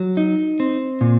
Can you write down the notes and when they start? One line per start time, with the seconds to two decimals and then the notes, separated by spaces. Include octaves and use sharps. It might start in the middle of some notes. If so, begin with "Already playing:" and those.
Already playing: F#3
0.17 D#4
0.60 C4
1.01 A#2